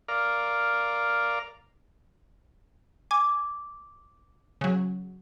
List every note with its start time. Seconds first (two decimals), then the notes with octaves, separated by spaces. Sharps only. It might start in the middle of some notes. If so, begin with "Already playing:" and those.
0.08 A#4 D5 F5
3.11 G#5 D6
4.61 C#3 F#3